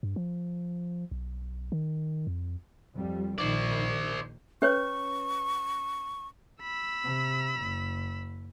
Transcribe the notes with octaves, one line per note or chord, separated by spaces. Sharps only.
G2
F3
B1
D#3
F2
F2 G3
A#1 D#3 C5 D5
C#4 B4 C#5 C#6
B5 E6
C3
F#1